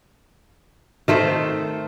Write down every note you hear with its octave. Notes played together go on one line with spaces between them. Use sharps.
D#3 A3 C5